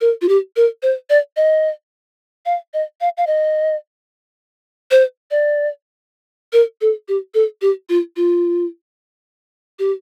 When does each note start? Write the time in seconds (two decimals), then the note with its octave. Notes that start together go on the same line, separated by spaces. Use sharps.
0.01 A#4
0.21 F4
0.29 G4
0.56 A#4
0.82 C5
1.10 D5
1.37 D#5
2.46 F5
2.74 D#5
3.01 F5
3.17 F5
3.27 D#5
4.91 C5
5.31 D5
6.53 A#4
6.81 A4
7.08 G4
7.34 A4
7.62 G4
7.89 F4
8.16 F4
9.79 G4